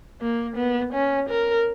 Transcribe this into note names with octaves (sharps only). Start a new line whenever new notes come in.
A#3
B3
C#4
A#4